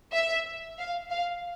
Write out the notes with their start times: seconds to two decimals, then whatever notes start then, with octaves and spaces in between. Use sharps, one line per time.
0.12 E5
0.78 F5
1.10 F5